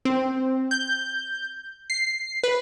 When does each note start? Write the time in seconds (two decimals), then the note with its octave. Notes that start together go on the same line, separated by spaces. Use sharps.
0.05 C4
0.71 G6
1.90 C7
2.44 B4